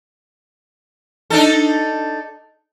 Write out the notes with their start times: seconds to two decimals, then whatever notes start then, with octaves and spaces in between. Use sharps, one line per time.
1.30 D4 D#4 A4